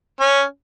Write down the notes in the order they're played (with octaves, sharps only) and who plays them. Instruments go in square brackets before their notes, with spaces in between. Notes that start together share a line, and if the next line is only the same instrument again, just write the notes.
[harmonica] C#4